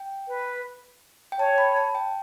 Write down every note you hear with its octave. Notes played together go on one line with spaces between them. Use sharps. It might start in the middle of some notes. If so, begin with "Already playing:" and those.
Already playing: G5
B4
G5
C#5 A5
B5
A5
G5